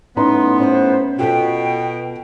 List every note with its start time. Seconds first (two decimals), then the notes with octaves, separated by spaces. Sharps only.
0.17 A2 B3 C#4 D#4 A#5 C6
0.60 C#4 C5
1.19 B2 F4 A4 G5